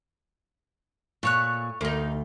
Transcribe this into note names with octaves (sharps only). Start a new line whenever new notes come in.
A#2 A3 C#5 F#6
D2 A#3 D#4